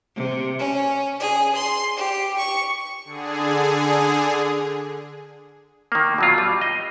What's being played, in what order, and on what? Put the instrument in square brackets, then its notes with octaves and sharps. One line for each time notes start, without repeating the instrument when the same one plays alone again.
[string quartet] C3
C#4
G#4
C6
G4
C#6
[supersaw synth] D3 G#4
[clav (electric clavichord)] D#3 A#3
B2 F#3 F4
G3
D#5